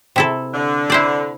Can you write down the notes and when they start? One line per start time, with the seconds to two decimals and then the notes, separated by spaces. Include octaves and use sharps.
0.16 C3 E4 A4
0.54 D3
0.90 E4 C5 D5